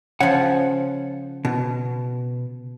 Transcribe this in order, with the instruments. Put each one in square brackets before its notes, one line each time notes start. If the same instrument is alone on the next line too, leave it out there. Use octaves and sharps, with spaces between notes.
[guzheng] C#3 F3 [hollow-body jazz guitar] F#5
[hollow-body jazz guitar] B2